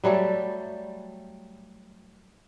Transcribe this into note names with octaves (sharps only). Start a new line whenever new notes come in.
F#3 G3 A3 A4